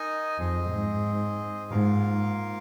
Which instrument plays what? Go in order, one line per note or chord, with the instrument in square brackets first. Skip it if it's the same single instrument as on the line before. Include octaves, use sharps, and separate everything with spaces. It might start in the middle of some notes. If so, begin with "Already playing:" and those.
Already playing: [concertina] D#4 A#4 D#5 G#5
[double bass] F2 [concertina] C4 G#4 D#5
[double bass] G#2
[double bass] G#2 [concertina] A#3 F4 A#4 F5